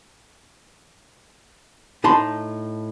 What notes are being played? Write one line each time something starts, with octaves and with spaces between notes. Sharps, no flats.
A2 D#4 A5 B5 C6